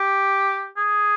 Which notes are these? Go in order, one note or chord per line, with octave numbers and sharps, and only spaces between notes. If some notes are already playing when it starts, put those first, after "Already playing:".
Already playing: G4
G#4